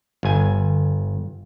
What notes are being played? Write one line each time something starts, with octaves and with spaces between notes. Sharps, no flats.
G1 G#5